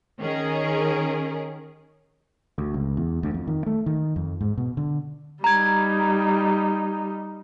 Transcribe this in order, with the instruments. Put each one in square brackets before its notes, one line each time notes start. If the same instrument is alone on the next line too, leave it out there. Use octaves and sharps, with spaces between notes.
[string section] D#3 C#4 G#4 A#4
[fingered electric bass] D2
C#2
E2
D2
F2
D#3
A3
D#3
F2
G#2
B2
D3
[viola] G3 D#4 [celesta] A#5 G#6